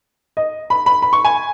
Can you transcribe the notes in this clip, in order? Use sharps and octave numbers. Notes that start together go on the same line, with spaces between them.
D#5
B5
B5
B5
C#6
G#5